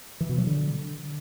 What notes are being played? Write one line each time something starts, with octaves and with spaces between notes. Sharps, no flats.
E3
B2
F#3
D3